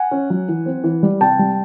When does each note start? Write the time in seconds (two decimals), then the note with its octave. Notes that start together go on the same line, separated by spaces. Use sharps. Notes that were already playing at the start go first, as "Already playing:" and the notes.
Already playing: F#5 G#5
0.11 C#4
0.30 F#3
0.48 E3
0.66 C4
0.84 E3
1.03 G3
1.21 C3 G5 A5
1.39 G3